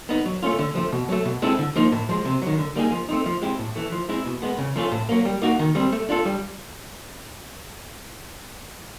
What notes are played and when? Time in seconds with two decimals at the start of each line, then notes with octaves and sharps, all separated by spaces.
0.09 B3 D#4
0.26 F#3
0.43 A3 C#4 F4
0.59 D3
0.75 F3 A3
0.92 B2
1.09 F#3 A3
1.25 B2
1.42 G#3 C4 E4 A4
1.59 D3
1.76 F3 A#3 D#4
1.92 A2
2.09 F3 G#3
2.25 C3
2.42 D#3 F#3
2.59 D3
2.75 G3 A#3 D#4 G#4
2.92 F3
3.09 A3 C4 D#4
3.26 F3
3.42 G#3 C4 E4 G4
3.59 A2
3.76 E3 A3
3.92 F3
4.09 G#3 C4 E4
4.26 B2
4.42 G#3 B3
4.58 C#3
4.76 F3 A3 C#4 F4
4.92 A2
5.09 F#3 A#3
5.25 G3
5.42 A#3 D#4 F#4
5.59 D#3
5.75 G3 C4
5.92 A3
6.09 D4 F4 A4
6.25 G3